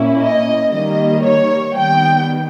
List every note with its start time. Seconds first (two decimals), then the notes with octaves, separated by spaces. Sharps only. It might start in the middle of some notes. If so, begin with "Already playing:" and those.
Already playing: A#2 A#3 C#4 E4
0.21 D#5
0.72 D#3 G3 A#3 D#5
1.24 C#5
1.75 D#3 G3 B3 G5